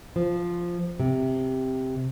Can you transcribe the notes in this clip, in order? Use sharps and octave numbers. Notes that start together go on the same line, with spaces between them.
F3
C3